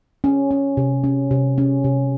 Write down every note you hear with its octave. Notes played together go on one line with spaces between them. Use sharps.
C#4
C#4
C3
C#4
C3
C#4
C3